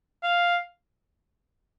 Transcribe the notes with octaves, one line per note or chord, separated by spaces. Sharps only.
F5